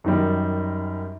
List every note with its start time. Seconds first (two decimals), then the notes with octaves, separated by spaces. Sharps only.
0.04 F#2 D#3 G3